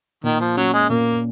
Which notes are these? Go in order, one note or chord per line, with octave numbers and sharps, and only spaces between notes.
A#2 D#3
F3
F#3 C#4
G#3
A#2 A#3